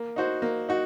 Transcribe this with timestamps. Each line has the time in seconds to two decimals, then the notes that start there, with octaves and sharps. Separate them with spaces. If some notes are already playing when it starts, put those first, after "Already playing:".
Already playing: A#3
0.16 D#4 F#4 C5
0.42 A#3
0.69 D#4 F#4